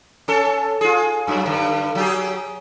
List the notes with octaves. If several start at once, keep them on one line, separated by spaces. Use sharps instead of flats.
C#4 A4
F4 G#4
F#2 F#3
G2 D3
F#3 G4 G#4